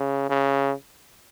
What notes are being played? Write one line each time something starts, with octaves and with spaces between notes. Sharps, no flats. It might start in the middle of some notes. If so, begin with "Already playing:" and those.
Already playing: C#3
C#3